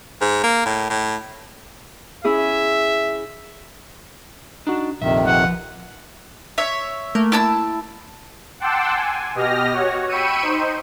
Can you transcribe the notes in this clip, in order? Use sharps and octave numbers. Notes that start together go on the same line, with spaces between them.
G#2
A#3
A2
A2
C#4 E4 G#4 E5
D4 D#4 F#4
A#1 F2 C3 D#3 E5
F3 B4 F#5
C#5 E5
A3 A#3 A#4
E4 A5 E6
F#5 G5 A5 C6 D6 E6
G#5
B2 G4 D#5 F6 A#6
F#4 C#5
G5 B5 C#6 E6 C#7 D#7
D#4 C5